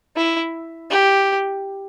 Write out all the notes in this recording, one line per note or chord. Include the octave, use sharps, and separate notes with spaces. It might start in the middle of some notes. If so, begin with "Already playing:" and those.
E4
G4